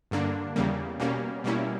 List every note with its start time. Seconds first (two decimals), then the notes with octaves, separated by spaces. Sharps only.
0.11 G2 D3 A#3 D4
0.56 E2 C#3 G3 A#3
1.00 B2 G3 A#3 C#4
1.44 B2 G3 A#3 C#4 E4